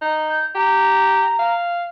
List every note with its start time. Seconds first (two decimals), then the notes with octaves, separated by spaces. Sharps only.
0.01 D#4
0.29 G6
0.55 G4 A#5
1.39 F5